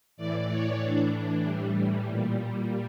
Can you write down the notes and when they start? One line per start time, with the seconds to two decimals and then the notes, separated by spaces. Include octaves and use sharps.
0.17 A2 E3 D5
0.49 C#5
0.81 A2 E3 D4
1.45 A2 E3 G3
2.08 A#2